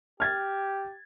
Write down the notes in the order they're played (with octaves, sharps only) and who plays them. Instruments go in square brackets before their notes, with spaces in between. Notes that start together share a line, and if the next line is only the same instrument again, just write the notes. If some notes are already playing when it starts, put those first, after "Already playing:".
[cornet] G4 [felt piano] F6 G#6 A6